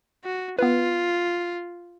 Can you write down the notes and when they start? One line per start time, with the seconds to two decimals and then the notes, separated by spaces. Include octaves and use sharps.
0.24 F#4
0.59 B3 F4 B4